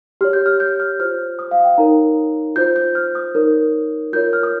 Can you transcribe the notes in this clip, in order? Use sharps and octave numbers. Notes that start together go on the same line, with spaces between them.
G4 C#5 F6
G6
F6
G6
F6
F4 C5 F6
D#6
F5
G5
D#4 A#4 C#5 A#5
F4 C5 G6
G6
F6
D#6
D#4 A#4 C#5
F4 A#4 C#5 G6
F6
D#6